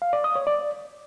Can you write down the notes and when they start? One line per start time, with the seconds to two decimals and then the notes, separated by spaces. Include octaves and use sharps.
0.02 F5
0.13 D5
0.24 D#6
0.36 C#5
0.47 D5